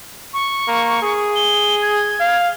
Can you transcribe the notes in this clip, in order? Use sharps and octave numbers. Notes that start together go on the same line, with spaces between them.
C#6
A#3
G#4
G7
G#6
F5